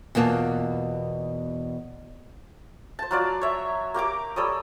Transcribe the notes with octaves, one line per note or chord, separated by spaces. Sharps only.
E2 B2 A#3 F4 A5
C5 A5
F#3 F4 D5
C#5 E5
A#3 G4 A#5 D6
G3 A4 C#5 D#6